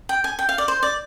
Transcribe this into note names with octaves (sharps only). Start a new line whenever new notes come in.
G5
G#5
G5
F5
D5
C5
D5